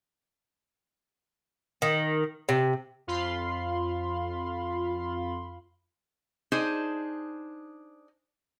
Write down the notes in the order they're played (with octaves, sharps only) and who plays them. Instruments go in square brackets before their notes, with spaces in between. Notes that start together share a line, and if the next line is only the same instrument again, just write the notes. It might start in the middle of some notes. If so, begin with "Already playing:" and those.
[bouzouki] D#3
C3
[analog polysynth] F2 F4 F5 B5 C6
[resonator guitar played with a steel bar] D4 D#4 G#4 C5